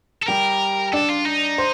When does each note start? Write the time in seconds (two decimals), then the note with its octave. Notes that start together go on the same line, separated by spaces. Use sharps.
0.23 A4
0.28 G3 G4 A#4
0.93 D4 A4 D5
1.09 F4
1.25 D#4
1.58 C5